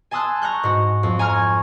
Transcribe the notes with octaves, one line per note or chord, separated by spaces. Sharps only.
G#5 A5 C6 D#6 E6 F#6
A#5 C#6 F#6 G6
G#2 F#4
F2
G#5 A#5 C#6 F6 G#6